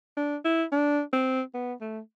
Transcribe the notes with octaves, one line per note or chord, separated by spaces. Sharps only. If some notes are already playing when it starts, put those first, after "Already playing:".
D4
E4
D4
C4
B3
A3